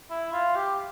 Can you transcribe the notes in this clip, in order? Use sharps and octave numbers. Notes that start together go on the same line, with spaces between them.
E4
F4
G4